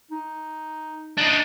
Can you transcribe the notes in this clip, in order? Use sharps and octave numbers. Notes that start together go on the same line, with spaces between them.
D#4
D4 D#4